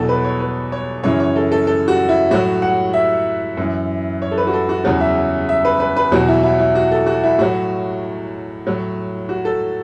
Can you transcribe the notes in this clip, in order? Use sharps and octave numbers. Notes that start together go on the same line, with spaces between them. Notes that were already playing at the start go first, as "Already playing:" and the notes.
Already playing: E2 B2 F#3 F#4 A4
B4
C#5
B4
C#5
F#2 C#3 E3 C#5
C#5
A4
A4
A4
F#4
E4
A2 F#3 F#4
F#5
E5
F#2 E3
C#5
A4
B4
F#4
A4
F#4
E2 C#3 F#3 F#4
E5
E5
B4
B4
B4
E2 B2 F#3 F#4
E4
E4
E4
F#4
A4
F#4
E4
A2 F#3 F#4
A2 F#3
F#4
A4